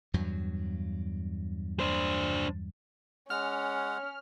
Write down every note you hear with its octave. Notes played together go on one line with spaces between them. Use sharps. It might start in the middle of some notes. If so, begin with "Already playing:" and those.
E2 G2 F#3
D4 C5
G#3 C#4 F#5 F6